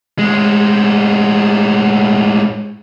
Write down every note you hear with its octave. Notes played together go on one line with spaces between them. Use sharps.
A2 G#3